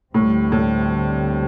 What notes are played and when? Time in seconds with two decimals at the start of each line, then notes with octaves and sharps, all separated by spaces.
0.14 D2 A2 D3 G3 C4
0.52 A2